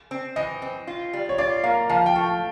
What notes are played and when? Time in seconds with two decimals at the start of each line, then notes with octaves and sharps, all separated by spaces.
0.11 C4
0.36 E3 D#5
0.62 C4
0.87 F4
1.13 G3
1.29 C#5
1.38 F4 D5
1.63 A#3 F5
1.89 F3 F5
2.06 G5
2.15 A3